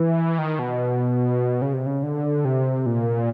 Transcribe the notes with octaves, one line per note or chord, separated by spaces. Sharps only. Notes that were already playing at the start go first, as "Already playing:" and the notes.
Already playing: E3
D#3
B2
C#3
C3
C#3
D3
C3
A#2